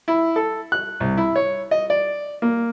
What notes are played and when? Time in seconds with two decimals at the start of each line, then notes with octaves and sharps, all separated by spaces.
0.08 E4
0.36 A4
0.72 F#6
1.00 C2
1.17 E4
1.36 C#5
1.71 D#5
1.90 D5
2.42 A#3